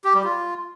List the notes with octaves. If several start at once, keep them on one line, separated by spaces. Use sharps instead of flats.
G4
G3
F4